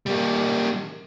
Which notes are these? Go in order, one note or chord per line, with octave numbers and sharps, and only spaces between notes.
G3 A#3